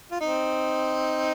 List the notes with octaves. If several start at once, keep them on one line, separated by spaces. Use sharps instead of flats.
F4
C4 D#4